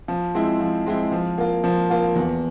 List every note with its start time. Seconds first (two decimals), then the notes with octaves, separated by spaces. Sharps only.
0.08 F3
0.35 G#3 C4 E4
0.60 F3
0.86 G#3 C4 E4
1.12 F3
1.38 A#3 F4
1.64 F3
1.90 A#3 F4
2.15 E2